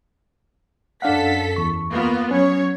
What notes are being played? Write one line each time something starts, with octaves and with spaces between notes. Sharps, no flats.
F#2 D4 A4 F5 F#5 B6
E2 C#6
A#3 B3 F4
F#3 C#4 C#5